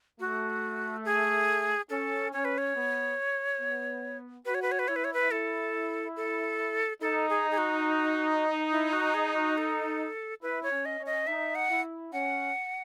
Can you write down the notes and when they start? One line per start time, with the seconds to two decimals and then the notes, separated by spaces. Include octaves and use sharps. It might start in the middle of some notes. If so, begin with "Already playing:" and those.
0.19 A3 F#4
1.05 G#4
1.90 C#4 A4
2.33 C#4 C#5
2.45 B4
2.58 C#5
2.75 B3
3.60 B3
4.45 F#4 B4
4.55 C#5
4.62 B4
4.72 C#5
4.79 B4
4.88 E4 C#5
4.96 B4
5.04 C#5
5.13 B4
5.31 E4 A4
6.17 A4
7.01 D#4 A4
7.29 G#4
7.51 G#4
7.58 F#4
8.71 E4
8.93 F#4
9.14 G#4
9.35 F#4
9.58 A4
10.42 E4 B4
10.63 C#5
10.70 C#4
10.85 D#5
10.99 C#4
11.06 D#5
11.27 D#4 E5
11.55 F#5
11.69 E4
12.12 C#4 F#5